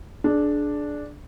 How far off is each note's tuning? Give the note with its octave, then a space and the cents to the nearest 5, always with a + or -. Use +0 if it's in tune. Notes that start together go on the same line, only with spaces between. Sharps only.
D4 +0 G#4 +30